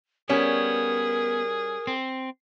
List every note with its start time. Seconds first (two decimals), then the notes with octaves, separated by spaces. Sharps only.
0.29 G3 B3 C#4 G#4 A#4
1.87 C4